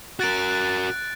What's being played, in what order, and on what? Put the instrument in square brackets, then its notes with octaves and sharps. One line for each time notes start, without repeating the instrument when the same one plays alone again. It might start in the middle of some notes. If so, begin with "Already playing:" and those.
[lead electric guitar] F#4 A#4 [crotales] F#6 A6 D7